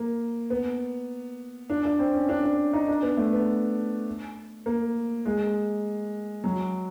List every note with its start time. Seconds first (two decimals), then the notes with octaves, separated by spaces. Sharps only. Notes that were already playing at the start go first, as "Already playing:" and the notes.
Already playing: A#3
0.50 B3
1.70 D4
1.85 D4
1.99 C4
2.14 C#4
2.29 D4
2.43 D4
2.73 D#4
2.88 D4
3.02 B3
3.17 A3
3.33 B3
4.66 A#3
5.26 G#3
6.44 F#3